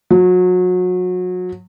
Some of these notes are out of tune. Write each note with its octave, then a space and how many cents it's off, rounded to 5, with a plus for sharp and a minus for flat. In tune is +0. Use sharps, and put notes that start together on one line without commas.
F#3 -30